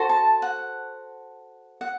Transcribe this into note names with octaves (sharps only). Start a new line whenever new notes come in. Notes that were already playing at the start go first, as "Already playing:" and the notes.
Already playing: F#4 A4 C5
A5
F#5
F#5